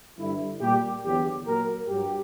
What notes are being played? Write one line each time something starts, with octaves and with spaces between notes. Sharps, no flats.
G2 D3 G3 E4
A#2 G3 G4
E2 D3 F#3 G4
A#2 F#3 A#4
G2 F#3 G4